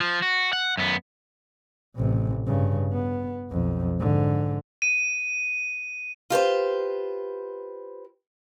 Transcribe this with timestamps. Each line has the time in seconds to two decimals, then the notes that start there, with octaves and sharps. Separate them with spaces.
0.01 F3
0.22 F#4
0.53 F#5
0.77 F#2 B3
1.96 A1 C3
2.47 G2 C#3
2.92 B3
3.49 B1 F2
3.99 G#2 D3
4.82 D#7
6.30 F4 G4 B4 C5